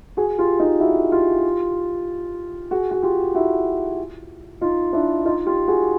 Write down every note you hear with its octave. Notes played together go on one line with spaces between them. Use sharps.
F#4 G#4
F4 G4
D#4 F4
E4 F#4
F4 G4
F#4 G#4
F#4
F4 G4
E4 F#4
D#4 F4
D4 E4
D#4 F4
F4 G4
F#4 G#4